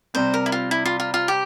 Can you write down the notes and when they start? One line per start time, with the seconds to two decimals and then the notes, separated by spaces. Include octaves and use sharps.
0.14 C3 G3 C4 C5
0.34 A#4
0.46 E4
0.52 F4
0.71 E4
0.85 F4
1.00 F4
1.14 F4
1.28 G4